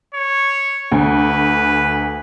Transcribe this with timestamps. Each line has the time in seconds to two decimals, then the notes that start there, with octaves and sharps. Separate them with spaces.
0.14 C#5
0.92 D2 B4